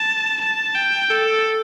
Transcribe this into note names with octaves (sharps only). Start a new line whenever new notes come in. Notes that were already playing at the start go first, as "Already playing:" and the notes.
Already playing: A5
A5
G5
A4